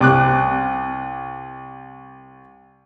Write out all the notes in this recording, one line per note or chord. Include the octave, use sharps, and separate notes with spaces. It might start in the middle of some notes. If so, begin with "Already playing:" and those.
C2 D6 F#6